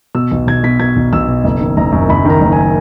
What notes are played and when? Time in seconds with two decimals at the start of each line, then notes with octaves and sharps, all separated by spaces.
0.15 B2 E6
0.31 B1
0.47 B1 G#6
0.63 B2 B6
0.80 B2 G#6
0.96 B1
1.13 B1 E6
1.28 B2
1.44 F#1
1.60 D#3
1.77 F#1 A#5
1.92 F#2
2.09 F#1 B5
2.25 D#3
2.30 A#5
2.41 F#1
2.52 G#5